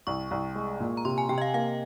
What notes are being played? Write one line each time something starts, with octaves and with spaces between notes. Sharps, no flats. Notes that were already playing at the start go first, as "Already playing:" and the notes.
C2 C#6
C2
G#3
A#2
A#5
C3 C6
G#5
C3 G5
D#5
F5
A#3 F5